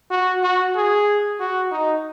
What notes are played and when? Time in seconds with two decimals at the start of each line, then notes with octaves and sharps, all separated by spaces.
0.11 F#4
0.43 F#4
0.76 G#4
1.40 F#4
1.71 D#4